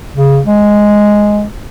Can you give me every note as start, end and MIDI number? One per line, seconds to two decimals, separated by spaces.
0.16 0.40 49
0.46 1.46 56